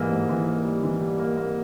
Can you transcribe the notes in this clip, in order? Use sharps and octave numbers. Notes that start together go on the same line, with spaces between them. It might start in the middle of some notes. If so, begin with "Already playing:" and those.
Already playing: G#2 E3 G3 A#3
G#2
E3
A#3
G3
E3
G3
A#3
A#3